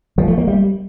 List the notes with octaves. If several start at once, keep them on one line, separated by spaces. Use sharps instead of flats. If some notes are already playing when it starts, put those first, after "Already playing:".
F3
A3
A#3
G3